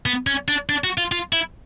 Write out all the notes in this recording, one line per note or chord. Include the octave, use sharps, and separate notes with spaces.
B3
C#4
D4
D4
F#4
F4
F4
E4